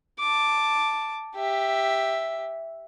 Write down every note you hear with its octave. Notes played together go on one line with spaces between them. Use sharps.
A5 D6
G4 E5